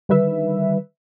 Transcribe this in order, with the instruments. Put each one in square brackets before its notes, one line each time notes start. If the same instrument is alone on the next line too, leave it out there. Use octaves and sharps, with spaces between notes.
[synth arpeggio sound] D3 D#3 G3 B4 E5